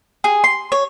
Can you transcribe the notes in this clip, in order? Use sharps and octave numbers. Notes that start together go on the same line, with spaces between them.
G#4
C6
C#5